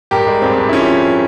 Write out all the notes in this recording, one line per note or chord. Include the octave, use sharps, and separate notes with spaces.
G2 G4 A#4
G#3
G2 C4
G2
E4
F3 C#4